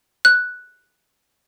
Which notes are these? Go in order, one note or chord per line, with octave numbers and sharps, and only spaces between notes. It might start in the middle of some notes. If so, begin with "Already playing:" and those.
F#6